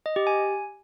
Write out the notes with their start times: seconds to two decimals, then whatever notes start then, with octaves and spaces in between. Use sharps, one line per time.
0.06 D#5
0.16 G4
0.27 G#5